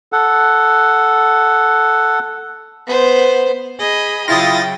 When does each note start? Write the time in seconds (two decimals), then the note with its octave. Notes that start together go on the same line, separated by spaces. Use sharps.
0.12 A4 F#5
2.87 B3 C5
3.79 G#4 D#5 B5
4.28 C#3 F#3 E4 F4 G5 D#6 A6 A#6